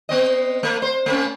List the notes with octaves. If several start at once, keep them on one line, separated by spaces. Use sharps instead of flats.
B3 C4 D#5
A3
C5
A3 C4 C#4